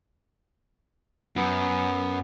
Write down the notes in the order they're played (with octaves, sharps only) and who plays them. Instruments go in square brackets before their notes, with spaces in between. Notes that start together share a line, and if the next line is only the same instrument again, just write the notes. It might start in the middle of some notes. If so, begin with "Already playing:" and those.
[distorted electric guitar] F#2 [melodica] B3